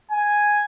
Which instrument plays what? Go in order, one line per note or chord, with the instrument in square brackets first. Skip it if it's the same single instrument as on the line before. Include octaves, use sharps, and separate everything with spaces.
[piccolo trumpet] G#5